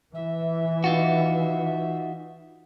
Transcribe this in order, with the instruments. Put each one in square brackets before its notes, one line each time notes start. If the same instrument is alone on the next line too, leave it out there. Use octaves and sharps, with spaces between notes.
[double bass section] E3 [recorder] E5
[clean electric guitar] D#4 F4 F#4